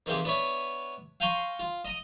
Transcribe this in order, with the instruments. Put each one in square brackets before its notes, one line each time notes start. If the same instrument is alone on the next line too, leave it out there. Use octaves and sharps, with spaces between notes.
[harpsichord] D#3 E3 A#3 C4 G4 G#4
B3 D4 E4 B4 C#5
F5 G5 G#5 A#5 C6 C#6
F4
D#5 A#5 D#6